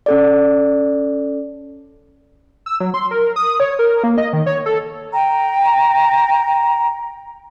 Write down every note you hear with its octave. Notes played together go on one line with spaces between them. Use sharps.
C#4 A4 D5
E6
F#3
C6
A#4
D#6
C#5
A#4
A#3
D#5
D#3
C#5
A4
G5 A#5